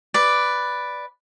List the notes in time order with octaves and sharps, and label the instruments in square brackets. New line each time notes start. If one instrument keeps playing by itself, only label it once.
[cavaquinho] B4 D5